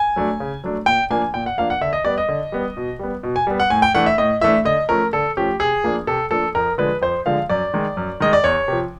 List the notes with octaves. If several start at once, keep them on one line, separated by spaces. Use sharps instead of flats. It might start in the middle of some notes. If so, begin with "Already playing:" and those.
Already playing: G#5
F#3 A3 D4
C#3
F#3 A3 D4
A#2 G5
F3 A#3 D4 G#5
A#2 G5
F#5
F3 A#3 D4 F5
F#5
D3 E5
D#5
G3 B3 D5
D#5
D3
G3 B3
B2
G3 B3
B2
G#5
G3 B3
F#5
A2 G#5
G5
E3 A3 D4 F#5
E5
A2 D#5
E3 A3 D4 E5
D3 D#5
F3 A3 C#4 A#4
D3 A4
F3 A3 C#4 G4
C3 G#4
F3 A#3 D4
C3 A4
F3 A#3 D4 A4
F2 A#4
D3 F3 G#3 B4
F2 C5
D3 F3 G#3 F5
F#2 D5
D#3 G#3
F#2
D#3 G#3 D#5
D5
E2 C#5
C3 F3